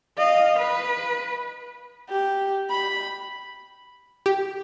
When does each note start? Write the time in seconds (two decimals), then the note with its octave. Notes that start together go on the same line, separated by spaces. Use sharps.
0.18 D#5 F5
0.59 B4
2.09 G4
2.70 B5
4.26 G4